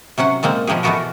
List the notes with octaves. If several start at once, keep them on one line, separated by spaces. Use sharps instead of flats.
C3 F#3 C#4 F#5
A#2 G#3 A#3 C4
B2 F3 A#3 G4 G#4
B2 E3 A3 B3 F#4 A#4